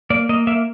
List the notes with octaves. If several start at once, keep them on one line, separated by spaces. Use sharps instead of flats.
A#3 D5
A#3 D#5
A#3 E5